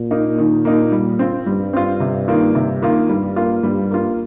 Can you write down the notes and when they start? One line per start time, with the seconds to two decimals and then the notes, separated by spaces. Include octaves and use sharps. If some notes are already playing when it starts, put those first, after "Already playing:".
Already playing: A#2
0.11 A#3 D#4
0.38 D#3
0.65 A#3 D#4
0.92 G3
1.19 C4 F4
1.47 G2 G3
1.73 C4 F4
2.00 C3
2.28 D#3 A#3 F4
2.55 C3
2.82 D#3 A#3 F4
3.09 G2 G3
3.36 A#3 F4
3.63 G2 G3
3.91 A#3 F4